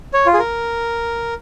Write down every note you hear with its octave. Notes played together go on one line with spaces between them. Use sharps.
C#5
F4
G#4
A#4